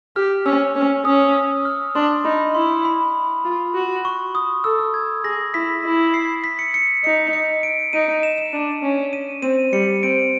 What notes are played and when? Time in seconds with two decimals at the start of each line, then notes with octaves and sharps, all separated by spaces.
0.16 G4 F6
0.46 C#4 E6
0.75 C#4
1.05 C#4 D#6
1.65 F6
1.95 D4 C6
2.25 D#4 B5
2.54 E4 C6
2.85 B5
3.45 F4
3.74 F#4
4.05 C#6
4.35 D#6
4.64 A4 E6
4.79 E6
4.94 G#6
5.24 G#4 A#6
5.54 E4 B6
5.84 E4
6.14 C7
6.44 B6
6.59 C#7
6.74 C#7
7.04 D#4 C#7
7.33 C#7
7.63 D7
7.93 D#4 D#7
8.23 E7
8.38 D#7
8.53 D4
8.83 C#4
9.13 D#7
9.42 C4 D#7
9.72 G3 C#7
10.03 C4 D7